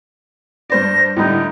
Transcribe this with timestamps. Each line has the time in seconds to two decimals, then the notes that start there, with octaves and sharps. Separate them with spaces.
0.70 G2 C5 D5 A#6
1.16 A2 D3 G3 D#4